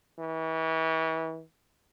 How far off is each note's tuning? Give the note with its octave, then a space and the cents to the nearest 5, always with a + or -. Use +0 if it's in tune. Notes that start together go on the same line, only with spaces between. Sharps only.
E3 -35